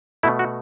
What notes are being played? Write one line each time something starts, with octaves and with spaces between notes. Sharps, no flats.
B2 A3 E4
F#4